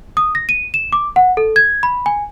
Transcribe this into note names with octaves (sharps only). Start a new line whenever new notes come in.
D#6
A#6
D#7
E7
D6
F#5
A4
G#6
B5
G#5